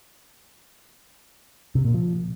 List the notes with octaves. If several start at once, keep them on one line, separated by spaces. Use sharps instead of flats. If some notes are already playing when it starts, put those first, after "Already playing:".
C3
A#2
F3